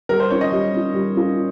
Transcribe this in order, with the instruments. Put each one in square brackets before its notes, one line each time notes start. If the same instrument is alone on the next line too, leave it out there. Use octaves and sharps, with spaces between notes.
[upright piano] G3 [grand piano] A#4
[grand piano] C5
[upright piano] C#4 F4 [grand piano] C#5
[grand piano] D#5
[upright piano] G3
C#4 F4
G3
C#4 F4